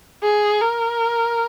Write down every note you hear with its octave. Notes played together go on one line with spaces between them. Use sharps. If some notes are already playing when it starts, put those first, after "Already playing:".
G#4
A#4